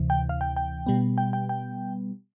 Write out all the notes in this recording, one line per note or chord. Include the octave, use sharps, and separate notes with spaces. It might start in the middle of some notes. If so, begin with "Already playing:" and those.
Already playing: D2 C3 E3
G5
F5
G5
G5
B2 G3 B3
G5
G5
G5